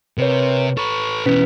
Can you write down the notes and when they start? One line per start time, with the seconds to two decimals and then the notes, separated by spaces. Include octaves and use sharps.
0.18 C3 A#4 B4 C#5
0.77 A4 B4 C#6
1.26 B2 E3 C#4 B4 B6